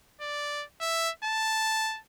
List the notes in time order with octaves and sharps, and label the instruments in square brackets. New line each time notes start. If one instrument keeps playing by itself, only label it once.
[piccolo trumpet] D5
E5
A5